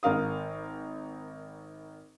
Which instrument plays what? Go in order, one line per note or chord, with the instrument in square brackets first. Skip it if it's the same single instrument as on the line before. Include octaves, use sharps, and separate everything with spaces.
[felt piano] G#1 A#4 F5 D#6